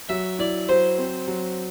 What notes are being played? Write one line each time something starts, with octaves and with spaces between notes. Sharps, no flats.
F#3 E5
E4 D5
F#3 C5
C4
F#3